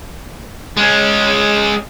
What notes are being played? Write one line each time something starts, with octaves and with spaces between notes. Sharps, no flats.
G#3 C#4